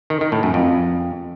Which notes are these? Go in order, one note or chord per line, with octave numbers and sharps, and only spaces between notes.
D#3
D#3
A2
F#2
F2